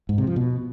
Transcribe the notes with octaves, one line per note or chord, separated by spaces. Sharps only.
G#2
C3
F3
B2